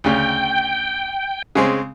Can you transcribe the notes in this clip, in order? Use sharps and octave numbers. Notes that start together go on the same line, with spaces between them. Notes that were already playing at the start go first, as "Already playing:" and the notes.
D2 C#3 G5
C#3 G#3 C4